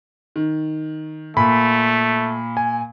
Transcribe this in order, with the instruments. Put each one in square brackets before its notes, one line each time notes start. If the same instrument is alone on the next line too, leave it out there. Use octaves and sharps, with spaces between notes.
[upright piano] D#3
[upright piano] A#2 [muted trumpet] A3 [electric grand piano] B5
[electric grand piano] G#5